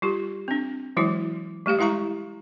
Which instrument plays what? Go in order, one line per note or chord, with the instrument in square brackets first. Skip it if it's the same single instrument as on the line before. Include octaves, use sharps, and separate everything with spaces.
[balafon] G3 F4 G4
C4 D4
E3 F#3 G#3 E4 F#4
G3 A3 G4 F5
G#3 E4 F5 A#5 C#6